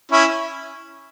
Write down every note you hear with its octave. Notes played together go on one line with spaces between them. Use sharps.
C#4 E4